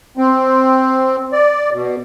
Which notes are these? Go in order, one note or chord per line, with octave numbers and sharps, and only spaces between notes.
C4
D5
B2